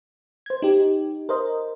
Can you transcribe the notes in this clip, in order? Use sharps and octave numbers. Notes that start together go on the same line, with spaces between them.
C5 G#6
D#4 G4
A#4 C5 D#5